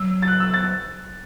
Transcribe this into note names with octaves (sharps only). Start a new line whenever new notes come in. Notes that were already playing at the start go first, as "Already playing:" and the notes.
Already playing: F#3 E6
A6
F#6
E6
A6